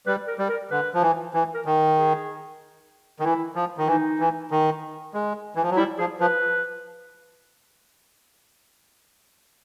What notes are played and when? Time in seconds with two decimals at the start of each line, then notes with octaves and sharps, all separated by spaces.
0.06 G3 B4
0.28 A#4
0.39 G3
0.49 A#4
0.71 D3 B4
0.94 F3
1.02 E3
1.34 E3
1.54 A#4
1.66 D#3
1.98 G#4
3.20 D#3
3.24 E3 E4
3.55 F3
3.78 D#3
3.87 E3 D#4
4.20 E3
4.51 D#3
5.14 G#3
5.55 E3
5.63 F3
5.71 F#3
5.77 G3 E4
5.99 F3 G#4
6.20 F3 B4